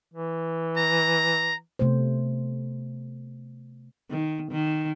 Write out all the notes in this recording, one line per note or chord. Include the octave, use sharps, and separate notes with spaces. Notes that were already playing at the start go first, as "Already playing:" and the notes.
E3
A#5
C3 A3 B3 C5
D#3
D#3